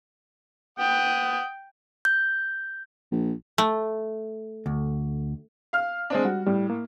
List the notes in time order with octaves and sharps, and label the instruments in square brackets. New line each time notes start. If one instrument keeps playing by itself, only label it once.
[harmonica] F#5 D#6 [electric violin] G5
[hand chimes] G6
[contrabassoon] A#1
[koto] A3
[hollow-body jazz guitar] D2
[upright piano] F5 F6
G#3 C4 D4
[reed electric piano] G3 [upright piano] F#4
[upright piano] A2 [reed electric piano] G3
[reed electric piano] A#3